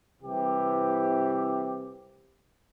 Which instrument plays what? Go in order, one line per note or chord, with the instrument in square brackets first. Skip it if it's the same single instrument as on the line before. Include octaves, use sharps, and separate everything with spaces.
[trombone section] C2 C3 E3 G4